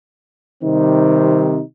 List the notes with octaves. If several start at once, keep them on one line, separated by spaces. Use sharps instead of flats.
C3 D#3 G3 C4 D#4